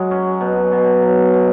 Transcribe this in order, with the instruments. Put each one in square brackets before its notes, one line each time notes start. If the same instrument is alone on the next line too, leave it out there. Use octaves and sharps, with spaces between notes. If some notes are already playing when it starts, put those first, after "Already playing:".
Already playing: [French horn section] F#3 [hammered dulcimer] G#3
[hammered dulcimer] C#4
B2
B2
B2
B2